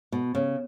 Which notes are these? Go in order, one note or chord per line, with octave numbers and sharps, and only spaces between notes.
B2
C#3